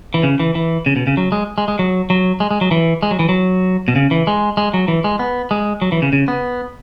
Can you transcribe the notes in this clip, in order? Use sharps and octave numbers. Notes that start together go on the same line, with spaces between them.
E3
C#3
E3
E3
C#3
B2
C#3
F#3
G#3
G#3
G#3
F#3
F#3
G#3
G#3
F#3
E3
G#3
F#3
E3
F#3
B2
C#3
E3
G#3
G#3
F#3
E3
G#3
B3
G#3
F#3
E3
C#3
C#3
B3